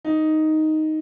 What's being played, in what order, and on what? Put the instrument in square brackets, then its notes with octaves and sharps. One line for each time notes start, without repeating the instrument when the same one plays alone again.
[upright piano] D#4